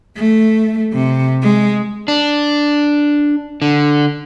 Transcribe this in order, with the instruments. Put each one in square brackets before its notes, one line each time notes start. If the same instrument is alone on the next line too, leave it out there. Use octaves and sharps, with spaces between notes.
[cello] A3
C3
G#3
[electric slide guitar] D4
D3